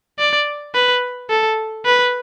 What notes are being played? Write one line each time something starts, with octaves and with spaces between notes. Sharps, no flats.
D5
B4
A4
B4